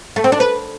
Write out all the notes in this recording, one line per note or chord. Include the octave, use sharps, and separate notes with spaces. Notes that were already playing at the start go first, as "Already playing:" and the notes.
A3
C4
D4
B4